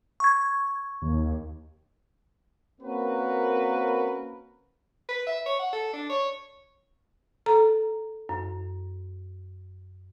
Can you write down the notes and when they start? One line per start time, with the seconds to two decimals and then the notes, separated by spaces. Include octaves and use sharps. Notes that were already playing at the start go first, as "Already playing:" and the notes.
0.20 C#6 G#6
1.02 D#2
2.81 A#3 C4 C#4 F#4 A#4 B4
5.08 B4
5.26 E5
5.46 C#5
5.59 F#5
5.72 A4
5.93 D4
6.09 C#5
7.46 A4 A#5
8.29 F#2